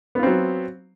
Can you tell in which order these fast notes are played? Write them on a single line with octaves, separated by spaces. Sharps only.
B3 F4 C4 F#3